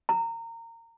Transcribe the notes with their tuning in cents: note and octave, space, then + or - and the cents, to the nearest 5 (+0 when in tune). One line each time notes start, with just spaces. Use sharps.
A#5 -25